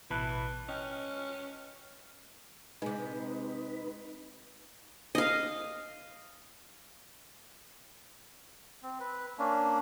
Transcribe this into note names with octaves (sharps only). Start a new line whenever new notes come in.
A1 B2 E3 B4 A5 B5 F#6
C#4 D#5 G5 F6
C3 G#3 D#4 B4
D#5 F5
C4
B4
A#3 C#4 D4